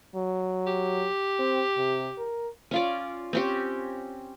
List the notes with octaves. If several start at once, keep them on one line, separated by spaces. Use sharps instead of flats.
F#3
G4
C4
C3
A#4
C#4 F4 D5
C4 C#4 G4